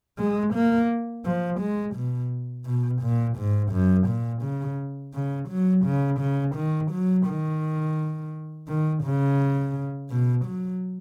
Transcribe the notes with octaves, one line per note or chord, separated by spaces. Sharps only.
G#3
A#3
F3
G#3
B2
B2
A#2
G#2
F#2
A#2
C#3
C#3
F#3
C#3
C#3
D#3
F#3
D#3
D#3
C#3
B2
F#3